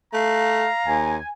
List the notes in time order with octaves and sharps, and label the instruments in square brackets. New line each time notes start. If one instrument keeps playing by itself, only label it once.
[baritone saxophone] A3 [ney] F5 [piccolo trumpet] A#5
[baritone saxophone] D#2 [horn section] G#5